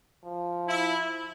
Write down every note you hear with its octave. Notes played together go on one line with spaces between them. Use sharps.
F3
E4